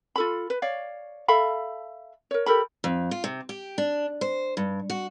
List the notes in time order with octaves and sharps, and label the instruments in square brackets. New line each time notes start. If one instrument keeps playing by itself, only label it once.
[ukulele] F4 A4 B5
B4
C#5 D5 F5
A4 E5 F5 B5
A#4 C#5
G4 A4 A#4 B5
[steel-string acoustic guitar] F2
F4
C3
G4
D4
C5
G2
F#4